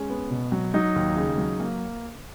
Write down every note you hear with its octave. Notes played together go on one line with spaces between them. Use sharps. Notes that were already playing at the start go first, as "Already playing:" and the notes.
Already playing: G#3 C#4
B3
B2
F#3
F#3 D#4
D#2
C#3
F#3
A#3